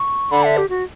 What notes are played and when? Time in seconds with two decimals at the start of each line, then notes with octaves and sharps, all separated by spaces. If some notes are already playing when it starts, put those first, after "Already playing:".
Already playing: C#6
0.31 D3 B5
0.44 E5
0.57 G4
0.69 F#4